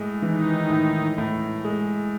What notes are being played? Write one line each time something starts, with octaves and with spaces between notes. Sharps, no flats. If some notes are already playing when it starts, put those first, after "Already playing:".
Already playing: A2 G#3
D#3 E3 D#4
A2
A2
G#3